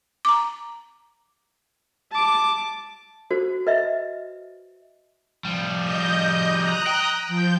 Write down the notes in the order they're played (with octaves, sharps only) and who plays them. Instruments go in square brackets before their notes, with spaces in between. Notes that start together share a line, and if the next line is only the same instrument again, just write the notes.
[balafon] A#5 D6
[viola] A5 D6
[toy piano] F#4 C5
B4 D#5 E5
[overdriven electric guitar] F3 G3
[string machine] D#5 G6
A#5 D#6 F#6
[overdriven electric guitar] G5
[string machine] F3 G6